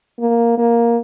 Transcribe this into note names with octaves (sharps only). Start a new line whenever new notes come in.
A#3
A#3